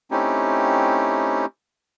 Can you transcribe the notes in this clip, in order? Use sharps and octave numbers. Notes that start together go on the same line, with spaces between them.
A3 C4 C#4 D#4 E4 G4